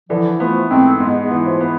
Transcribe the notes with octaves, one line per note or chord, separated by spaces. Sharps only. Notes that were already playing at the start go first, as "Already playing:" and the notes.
D3 E3 F3
F3 A3 B3
G#2 A3 C4
G#2 G#3 B3
G#3 B3
E3
F3 A3
B3